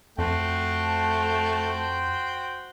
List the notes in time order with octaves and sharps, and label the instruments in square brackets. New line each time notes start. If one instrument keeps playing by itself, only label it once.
[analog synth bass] F2 [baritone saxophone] A3 [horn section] F#4 C5 G5